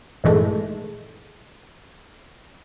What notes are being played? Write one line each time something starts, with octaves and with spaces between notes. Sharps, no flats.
A#1 G2 D#3 E3 G#3 A3